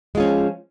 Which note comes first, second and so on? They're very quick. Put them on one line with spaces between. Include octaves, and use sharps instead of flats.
G#3 F4 C#4 F3